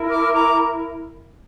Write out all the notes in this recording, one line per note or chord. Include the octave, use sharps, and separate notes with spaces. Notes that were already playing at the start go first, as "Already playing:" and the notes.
Already playing: E4 A#4
D6 F6
A#5 D6